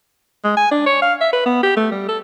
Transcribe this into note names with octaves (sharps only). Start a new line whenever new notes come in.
G#3
G#5
D4
C#5
F5
E5
B4
B3
G4
A3
G3
A4